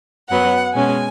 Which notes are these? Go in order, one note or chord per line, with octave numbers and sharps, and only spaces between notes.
F#2 F#3 B3 F#5
B2 G#3 C#4 G#5